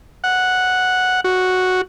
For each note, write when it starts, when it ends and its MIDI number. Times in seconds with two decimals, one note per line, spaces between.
0.24 1.21 78
1.24 1.81 66